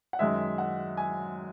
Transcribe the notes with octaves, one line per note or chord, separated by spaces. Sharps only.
F#5
F#2 D#3 G#3 E5
F#5
G#5